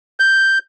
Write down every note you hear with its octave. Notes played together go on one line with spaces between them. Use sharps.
G6